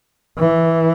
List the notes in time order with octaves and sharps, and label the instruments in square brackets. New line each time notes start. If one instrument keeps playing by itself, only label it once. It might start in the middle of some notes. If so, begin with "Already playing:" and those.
[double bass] E3